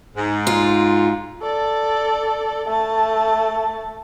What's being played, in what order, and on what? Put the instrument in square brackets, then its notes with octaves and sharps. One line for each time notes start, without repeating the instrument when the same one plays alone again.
[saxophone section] G#2
[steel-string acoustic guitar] F4
[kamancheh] A4 D5
A3 A5